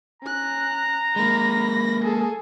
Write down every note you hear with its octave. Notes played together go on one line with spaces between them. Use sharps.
C#4 A#5 F#6
G#3 A#3 B5 A#6
G#4 A4